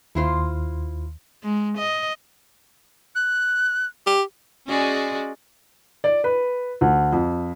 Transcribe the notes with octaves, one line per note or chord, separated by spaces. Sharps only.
D#2 E4 F4 C5
G#3
D#5
F#6
G4
G#3 C#4 F#4 G#4 D5
D5
B4
D2
F2